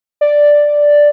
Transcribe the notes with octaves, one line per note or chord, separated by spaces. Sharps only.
D5